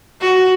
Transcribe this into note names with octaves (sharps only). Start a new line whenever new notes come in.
F#4